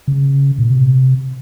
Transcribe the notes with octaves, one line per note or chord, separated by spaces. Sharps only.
C#3
A#2
C3